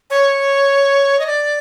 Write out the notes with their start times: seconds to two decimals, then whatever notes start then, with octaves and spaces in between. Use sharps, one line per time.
0.10 C#5
1.19 D#5
1.27 D5